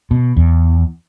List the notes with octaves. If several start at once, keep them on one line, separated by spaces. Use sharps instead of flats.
B2
E2